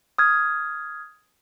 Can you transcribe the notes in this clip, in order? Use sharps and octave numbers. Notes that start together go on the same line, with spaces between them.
D#6 F6 G#6